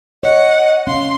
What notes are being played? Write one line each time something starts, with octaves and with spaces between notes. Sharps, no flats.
C#5 D#5 F#5
C#4 F5 C6